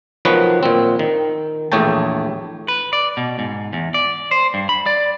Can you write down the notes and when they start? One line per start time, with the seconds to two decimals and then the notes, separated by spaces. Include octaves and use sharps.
0.25 D#3 F3 F#3 B3 F#4 B4
0.63 A#2 C4
0.99 D#3
1.72 A#1 E2 A3 C#5 G5 A5
2.68 B4
2.93 D5
3.17 B2
3.39 G#2
3.73 E2
3.94 D5
4.31 C5
4.54 G2
4.69 B5
4.86 D5